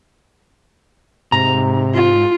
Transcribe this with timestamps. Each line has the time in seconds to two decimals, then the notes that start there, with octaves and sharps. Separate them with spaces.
1.32 G#2 C3 A#5
1.94 F4